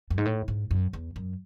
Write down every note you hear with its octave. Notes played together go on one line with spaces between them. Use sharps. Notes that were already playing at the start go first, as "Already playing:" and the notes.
F#2
G#2
A2
G#2
F#2
E2
F#2